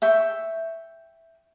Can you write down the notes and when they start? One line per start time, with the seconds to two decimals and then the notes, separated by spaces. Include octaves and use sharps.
0.02 E5 G5 C#6